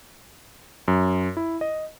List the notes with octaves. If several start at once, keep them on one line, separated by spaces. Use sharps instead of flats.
F#2
E4
D#5